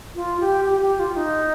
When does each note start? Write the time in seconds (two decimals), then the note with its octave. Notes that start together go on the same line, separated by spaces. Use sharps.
0.15 F4
0.40 G4
0.65 G4
0.82 G4
0.99 F4
1.16 D#4